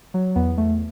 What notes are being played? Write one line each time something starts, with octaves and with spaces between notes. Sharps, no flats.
F#3
E2 B3
E2 A3